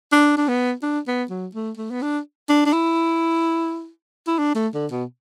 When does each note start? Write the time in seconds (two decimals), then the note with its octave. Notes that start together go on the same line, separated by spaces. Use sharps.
0.12 D4
0.37 D4
0.48 B3
0.83 D4
1.07 B3
1.30 F#3
1.55 A3
1.77 A3
1.91 B3
2.02 D4
2.49 D4
2.66 D4
2.73 E4
4.27 E4
4.38 D4
4.55 A3
4.74 D3
4.91 B2